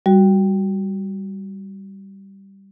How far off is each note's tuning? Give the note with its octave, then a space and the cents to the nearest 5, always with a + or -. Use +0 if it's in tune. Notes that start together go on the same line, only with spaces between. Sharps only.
G3 +0 F#4 +0